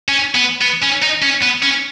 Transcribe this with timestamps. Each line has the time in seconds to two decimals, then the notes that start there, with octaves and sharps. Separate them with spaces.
0.08 C#4
0.35 B3
0.61 B3
0.82 C#4
1.02 D#4
1.22 C#4
1.42 B3
1.63 C#4